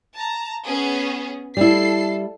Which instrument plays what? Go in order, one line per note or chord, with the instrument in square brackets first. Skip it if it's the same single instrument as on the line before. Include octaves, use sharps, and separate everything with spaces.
[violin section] A5 A#5
B3 C#4 G#4
[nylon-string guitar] G3 E4 [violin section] A4 C7